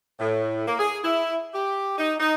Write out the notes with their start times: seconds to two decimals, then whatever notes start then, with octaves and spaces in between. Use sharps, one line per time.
0.19 A2
0.67 A#3
0.78 G#4
1.03 E4
1.53 G4
1.98 D#4
2.19 D#4